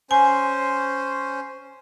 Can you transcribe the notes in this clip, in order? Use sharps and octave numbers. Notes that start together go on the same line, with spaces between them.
C#4 C5 G#5